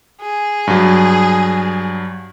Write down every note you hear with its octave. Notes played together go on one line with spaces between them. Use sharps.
G#4
G2 F#3